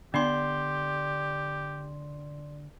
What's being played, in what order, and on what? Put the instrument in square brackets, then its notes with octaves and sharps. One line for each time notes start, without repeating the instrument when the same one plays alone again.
[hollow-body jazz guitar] D3 [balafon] B3 D4 [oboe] G4 [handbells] D5 C6